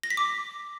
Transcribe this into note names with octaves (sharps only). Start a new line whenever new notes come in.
A#6
B6
D6